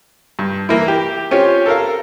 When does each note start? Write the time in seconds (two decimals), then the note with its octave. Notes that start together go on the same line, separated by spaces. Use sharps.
0.39 G2
0.69 E3 A#3 E4
0.88 G4
1.31 C4 C#4 F4 G4
1.66 A4 A#4 F5